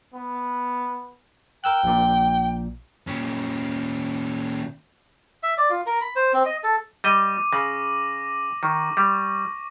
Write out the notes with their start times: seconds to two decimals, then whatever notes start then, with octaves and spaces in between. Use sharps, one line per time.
0.14 B3
1.64 A#4 G5 E6 F#6
1.83 A#1 A#2
3.07 A#2 C#4
5.43 E5
5.58 D5
5.70 F4
5.86 A#4
6.01 B5
6.16 C5
6.33 C4
6.46 D#5
6.63 A4
7.04 G3 D#5 D6 D#7
7.53 C#3 A#6 F#7
8.63 D#3 C#6
8.97 G3